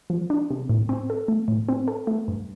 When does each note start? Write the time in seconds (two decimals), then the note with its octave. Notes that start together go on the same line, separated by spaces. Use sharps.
0.10 F3
0.30 D4
0.50 C3
0.69 A2
0.89 C4
1.10 A4
1.28 A3
1.48 A2
1.69 C4
1.88 A4
2.07 A3
2.28 G2